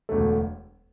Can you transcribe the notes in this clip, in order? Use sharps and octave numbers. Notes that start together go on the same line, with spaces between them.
E1 D2 D3 F#3 A3